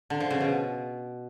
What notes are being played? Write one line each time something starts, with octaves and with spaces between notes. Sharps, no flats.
D3
F3
C#3
B2